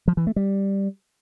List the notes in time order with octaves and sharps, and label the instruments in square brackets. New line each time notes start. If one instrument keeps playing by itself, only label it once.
[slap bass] F3
E3
A3
G3